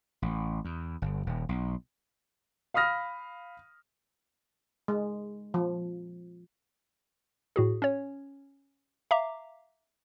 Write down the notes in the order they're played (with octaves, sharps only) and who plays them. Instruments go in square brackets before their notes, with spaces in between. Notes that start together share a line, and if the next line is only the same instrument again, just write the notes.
[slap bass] A1
E2
G1
D#1
B1
[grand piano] F5 B5 D#6 F6 A#6
[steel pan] G#3
F3
[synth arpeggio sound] A2 F#4 G#4
C#4 C#5
E5 F5 A#5 D6